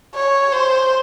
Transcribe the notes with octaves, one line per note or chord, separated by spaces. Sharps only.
C#5
C5